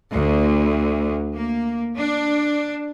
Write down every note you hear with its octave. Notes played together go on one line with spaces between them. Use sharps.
D2
A#3
D4